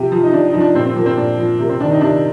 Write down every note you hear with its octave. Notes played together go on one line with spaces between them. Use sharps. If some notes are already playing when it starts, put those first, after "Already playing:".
Already playing: C3 F3 G4
F3
D#4
C3 D4
D#4
F3
D4
A#2 C4
C4
F3 A#3
C4
A#2 D4
F3
C3 A#3
C4
D#3 D4
D#4
C3 D4